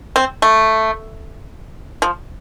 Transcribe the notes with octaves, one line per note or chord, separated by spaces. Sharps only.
C4
A3
F3